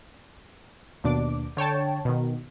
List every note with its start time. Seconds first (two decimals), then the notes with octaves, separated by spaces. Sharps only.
1.04 D#2 B2 D4 D6
1.57 D3 C#5 G5 A5
2.05 B2 D#3